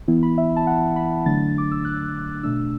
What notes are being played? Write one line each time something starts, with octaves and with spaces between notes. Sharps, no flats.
E3 B3 E4
B5
E5
A5
F#5
B5
D3 F#3 A3 D4 A6
D6
E6
F#6
B2 A3 D4 E6